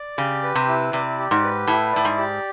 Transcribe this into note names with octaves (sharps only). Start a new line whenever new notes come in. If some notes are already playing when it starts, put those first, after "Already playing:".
Already playing: D5
C#3 G4
B4
C3
E4
C3 D5
G4
G#2
B4
A2 E4
A2 D5
G#2
G4